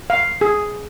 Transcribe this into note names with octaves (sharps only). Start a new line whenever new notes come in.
F5
G#4